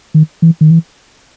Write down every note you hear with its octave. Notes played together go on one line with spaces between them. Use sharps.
D#3
E3
D#3
E3